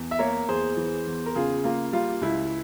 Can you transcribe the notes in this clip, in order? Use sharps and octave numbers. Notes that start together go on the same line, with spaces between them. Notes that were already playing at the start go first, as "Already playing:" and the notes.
Already playing: E2
E5
A#3 A#4 C#5
E2 G#4 C5
E3
E2
A#4
C#3 F4 G#4
A#3 F4
G3 F4
C#2 E4